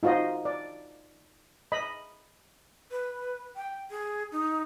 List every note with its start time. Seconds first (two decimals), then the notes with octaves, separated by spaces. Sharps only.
0.03 D#4 F4 F#4 C5 D#5
0.45 D5
1.72 D#5 B5
2.91 B4
3.56 G5
3.91 G#4
4.32 D#4